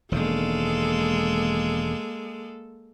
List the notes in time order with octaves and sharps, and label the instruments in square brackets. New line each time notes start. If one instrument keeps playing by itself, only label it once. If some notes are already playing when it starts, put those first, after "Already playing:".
[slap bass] E1 D#3 [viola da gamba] G#3 A#3 A4